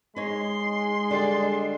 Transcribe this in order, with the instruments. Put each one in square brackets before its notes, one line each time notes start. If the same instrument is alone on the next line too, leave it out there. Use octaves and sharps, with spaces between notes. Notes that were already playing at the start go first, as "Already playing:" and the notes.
[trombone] G#3 [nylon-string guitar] D#4 C#5 [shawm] C6
[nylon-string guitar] D3 G3 [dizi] D5